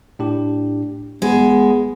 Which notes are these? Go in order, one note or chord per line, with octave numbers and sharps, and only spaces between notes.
A2 D4 G4
A1 G#3 B3